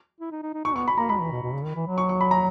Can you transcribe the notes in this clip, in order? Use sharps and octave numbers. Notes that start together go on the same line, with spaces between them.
E4
D#4
D#4
D#4
D#4 C#6
B3 C#6
B5
A#3 A#5
G#3 B5
E3
B2
B2
C#3
D#3
E3
F#3
C#6
C#6
B5
A#5